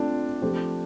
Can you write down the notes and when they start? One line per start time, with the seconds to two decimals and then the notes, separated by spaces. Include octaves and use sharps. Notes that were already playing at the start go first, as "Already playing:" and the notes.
Already playing: A3 C4 D4 F4
0.42 F3 A3 C4 G4 C5